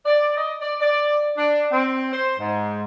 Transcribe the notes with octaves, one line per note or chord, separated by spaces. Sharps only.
D5
D#5
D5
D5
D4
C4
C5
G#2